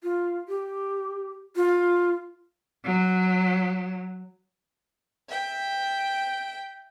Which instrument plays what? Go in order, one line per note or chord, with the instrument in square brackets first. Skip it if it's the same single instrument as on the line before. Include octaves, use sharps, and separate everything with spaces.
[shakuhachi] F4
G4
F4
[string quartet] F#3
[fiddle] E5 G5